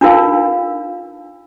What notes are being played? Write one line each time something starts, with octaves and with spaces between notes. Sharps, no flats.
D4 D#4 F4 A#4 F5